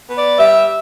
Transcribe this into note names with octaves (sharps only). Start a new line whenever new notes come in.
B3
D5
G3 E5